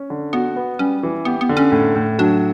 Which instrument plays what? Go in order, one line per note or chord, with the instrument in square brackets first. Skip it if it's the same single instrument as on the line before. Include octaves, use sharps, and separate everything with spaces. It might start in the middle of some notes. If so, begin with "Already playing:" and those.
Already playing: [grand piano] C#4
D3
[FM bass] B3 [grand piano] F#4
[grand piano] B3
[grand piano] G3 [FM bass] C#4
[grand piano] E3
[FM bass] B3 [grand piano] G4
[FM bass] B3
[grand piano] D3
[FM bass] C#4
[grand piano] A2
A2
[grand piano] F#3 [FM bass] D4